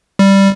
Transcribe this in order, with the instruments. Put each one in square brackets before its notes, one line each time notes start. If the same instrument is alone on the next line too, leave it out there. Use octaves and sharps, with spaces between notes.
[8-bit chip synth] G3